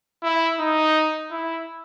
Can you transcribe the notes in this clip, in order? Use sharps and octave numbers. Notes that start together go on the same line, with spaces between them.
E4
D#4
E4